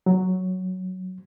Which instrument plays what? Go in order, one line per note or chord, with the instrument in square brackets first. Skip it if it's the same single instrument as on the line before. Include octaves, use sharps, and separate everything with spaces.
[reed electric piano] F#3